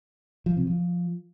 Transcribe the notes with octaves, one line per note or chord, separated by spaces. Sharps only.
F3
C3
F3